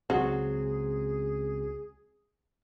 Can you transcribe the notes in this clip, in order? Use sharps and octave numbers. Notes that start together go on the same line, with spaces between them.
C#2 F#3 C4 F#4 G#4